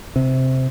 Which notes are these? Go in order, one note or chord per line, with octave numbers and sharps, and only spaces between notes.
C3